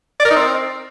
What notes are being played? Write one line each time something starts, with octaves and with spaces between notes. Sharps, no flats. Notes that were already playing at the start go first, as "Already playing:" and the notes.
D5
A#4
D#4
C4